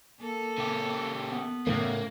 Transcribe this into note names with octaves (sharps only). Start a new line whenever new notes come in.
A#3 A4
C#3 G4
B3
A2 C#3 A3 A#3